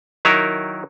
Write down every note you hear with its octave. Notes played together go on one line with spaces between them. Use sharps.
D#3 F#3 D#4 E4 A#4